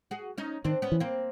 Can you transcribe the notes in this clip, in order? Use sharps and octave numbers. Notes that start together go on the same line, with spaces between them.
F#4 G#4
C#4 D#4
D#3 C4 D4
B3 C#4
E3
A#3 C4